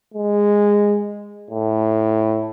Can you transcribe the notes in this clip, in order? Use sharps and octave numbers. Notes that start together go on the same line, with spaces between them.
G#3
A2